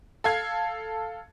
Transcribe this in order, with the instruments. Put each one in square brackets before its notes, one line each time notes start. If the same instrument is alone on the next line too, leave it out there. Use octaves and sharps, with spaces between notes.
[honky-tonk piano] A4 F5 G#6